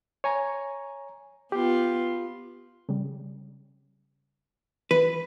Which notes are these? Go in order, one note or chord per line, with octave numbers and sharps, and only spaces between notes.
C#5 G#5 A#5
B3 F4 G4
C#3 G3
E3 B4